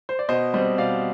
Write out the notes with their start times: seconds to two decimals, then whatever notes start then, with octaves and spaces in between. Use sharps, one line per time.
0.09 C5
0.19 D5
0.28 B2 C5 D#5
0.54 G3 C4 C5 D#5
0.78 B2 D5 F5